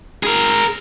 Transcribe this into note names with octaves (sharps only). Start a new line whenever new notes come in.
G#4 A#4